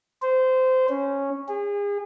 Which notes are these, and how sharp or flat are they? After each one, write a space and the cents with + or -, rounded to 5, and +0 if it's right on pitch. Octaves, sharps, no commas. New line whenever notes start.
C5 -20
C#4 -5
G#4 -35